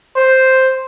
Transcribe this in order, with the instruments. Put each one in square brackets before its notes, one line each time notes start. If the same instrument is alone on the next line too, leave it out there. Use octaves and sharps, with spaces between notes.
[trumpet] C5